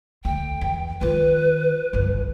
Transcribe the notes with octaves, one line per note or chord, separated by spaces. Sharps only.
D2 G5
E2
D#3 F4 B4
G1 C2